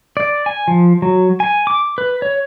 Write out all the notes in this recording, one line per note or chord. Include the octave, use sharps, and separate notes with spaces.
D5
G#5
F3
F#3
G#5
D6
B4
C#5